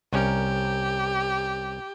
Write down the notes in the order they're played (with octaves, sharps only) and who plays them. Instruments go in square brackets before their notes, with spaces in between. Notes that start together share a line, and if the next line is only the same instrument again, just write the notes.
[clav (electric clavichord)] C2 C#4 A#4 [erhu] G4